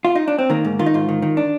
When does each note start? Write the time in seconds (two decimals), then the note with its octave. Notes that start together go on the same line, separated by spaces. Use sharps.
0.05 F4
0.15 D#4
0.28 D4
0.39 C4
0.50 D#3 A#3
0.65 G#2
0.79 D#3 F4
0.86 D#4
0.94 G#2 F4
1.09 D#3
1.22 D#3
1.37 D4